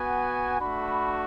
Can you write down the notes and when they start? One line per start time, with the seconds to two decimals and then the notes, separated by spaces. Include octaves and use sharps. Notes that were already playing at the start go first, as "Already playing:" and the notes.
Already playing: B3 F#4 G#5
0.59 A3 D4 F#4 B5